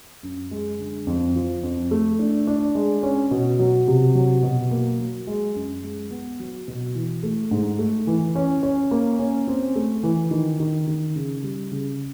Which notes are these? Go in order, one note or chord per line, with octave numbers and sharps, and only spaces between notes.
F#2
G#3
D3
F2
F3
F2
A3
D4
D4
G#3
C#4
B2
F#3
C3
F#3
B2
A#3
F#3
G#3
F#2
G#3
B3
F#3
B2
E3
A3
G#2
A3
E3
C#4
C#4
A#3
C#4
C4
A3
E3
D#3
D#3
D#3
C#3
G3
C#3